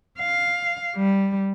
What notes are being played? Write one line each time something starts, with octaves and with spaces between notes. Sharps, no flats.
F5
G3